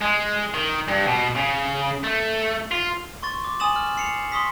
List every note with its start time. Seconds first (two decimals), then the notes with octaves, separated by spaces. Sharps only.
0.02 G#3
0.54 D#3
0.88 G2
1.06 B2
1.35 C#3
2.04 A3
2.71 F4
3.23 C6 C#6 A6
3.44 D6
3.60 G#5 D#6 A6 E7 F#7
3.76 F6
3.98 C7 C#7 F7
4.32 C6 C#6 D#6 B6